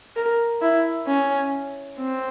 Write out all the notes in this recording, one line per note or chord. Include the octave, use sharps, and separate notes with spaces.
A#4
E4
C#4
C4